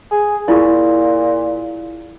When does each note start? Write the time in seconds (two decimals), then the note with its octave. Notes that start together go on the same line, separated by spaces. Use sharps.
0.11 G#4
0.48 A#2 E4 F4 G#4